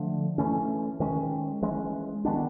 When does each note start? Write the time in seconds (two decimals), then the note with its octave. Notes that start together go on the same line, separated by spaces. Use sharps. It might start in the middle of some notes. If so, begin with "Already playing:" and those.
Already playing: D3 F3 A3 D4
0.38 E3 A3 C#4
1.00 D#3 G#3 C#4
1.62 E3 G#3 C#4
2.25 D#3 G#3 B3 D4